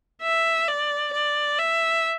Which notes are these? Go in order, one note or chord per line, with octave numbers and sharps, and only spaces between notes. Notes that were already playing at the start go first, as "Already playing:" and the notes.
E5
D5
D5
E5